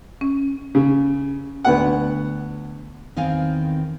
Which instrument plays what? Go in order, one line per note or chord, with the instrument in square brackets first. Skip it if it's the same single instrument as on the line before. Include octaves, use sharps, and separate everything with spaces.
[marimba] C#4
[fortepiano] C#3
D2 B3 F#5
[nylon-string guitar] E2 D#3 C4 F5 G#5